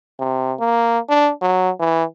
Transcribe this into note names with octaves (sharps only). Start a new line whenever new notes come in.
C3
A#3
D4
F#3
E3